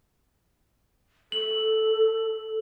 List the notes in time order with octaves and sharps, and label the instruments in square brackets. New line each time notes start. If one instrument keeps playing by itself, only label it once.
[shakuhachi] A4 [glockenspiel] F#7